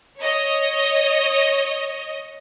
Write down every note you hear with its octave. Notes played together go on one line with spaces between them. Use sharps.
C#5 D#5